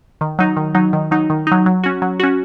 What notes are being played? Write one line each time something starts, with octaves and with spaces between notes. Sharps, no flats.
D#3
F#3 D#4
D#3
F#3 D#4
D#3
F#3 D#4
D#3
F#3 D#4
F#3
C#4 F#4
F#3
C#4 F#4